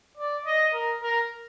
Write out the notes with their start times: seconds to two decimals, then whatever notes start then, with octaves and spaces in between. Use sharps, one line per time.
0.17 D5
0.46 D#5
0.74 A#4
1.02 A#4